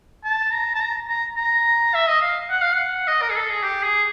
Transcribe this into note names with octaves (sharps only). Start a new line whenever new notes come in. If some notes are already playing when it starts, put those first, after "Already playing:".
A5
A#5
A5
A#5
A#5
A#5
E5
D#5
F5
F#5
F5
F#5
D#5
A#4
G#4
A4
G#4
G4
G#4